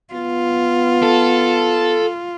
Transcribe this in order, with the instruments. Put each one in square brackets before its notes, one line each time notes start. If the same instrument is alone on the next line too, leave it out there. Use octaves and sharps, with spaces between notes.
[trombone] B3 [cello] F4
[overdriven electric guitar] A4